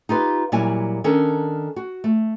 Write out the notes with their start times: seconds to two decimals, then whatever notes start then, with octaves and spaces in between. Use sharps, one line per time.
0.09 D#4 F4 G4 B4
0.52 A#2 F#3 G3 E4 G#5
1.04 D#3 C#4 D4 A4 A#4
1.76 F#4
2.04 A3